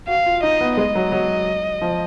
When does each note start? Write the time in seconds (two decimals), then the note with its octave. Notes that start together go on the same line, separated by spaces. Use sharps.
0.08 F#4 F5
0.26 F4
0.43 D#4 D#5
0.61 B3
0.77 G#3 D#5
0.95 F#3
1.12 F#3
1.81 F3